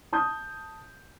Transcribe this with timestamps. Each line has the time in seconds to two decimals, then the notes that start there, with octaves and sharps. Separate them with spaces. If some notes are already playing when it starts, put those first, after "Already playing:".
0.13 A5 D#6 G6